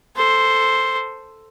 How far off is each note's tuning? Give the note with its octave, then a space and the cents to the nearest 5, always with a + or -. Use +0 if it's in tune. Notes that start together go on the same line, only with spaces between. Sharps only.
A4 +5 C5 +0